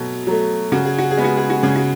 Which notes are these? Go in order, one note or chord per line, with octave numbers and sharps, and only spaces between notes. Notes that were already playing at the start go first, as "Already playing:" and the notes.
Already playing: B2 F#3 A3
F#3 A3
C#3 F#4
G#4
F#4
G#4
G#3 B3
F#4
G#4
F#4
C#3 G#4
F#4